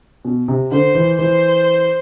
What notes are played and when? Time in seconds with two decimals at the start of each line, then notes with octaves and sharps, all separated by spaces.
0.25 B2
0.48 C3
0.72 D3 C5
0.95 E3
1.18 E3 C5